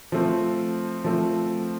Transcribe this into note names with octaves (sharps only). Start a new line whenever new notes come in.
F3 A3 C4
F3 A3 C4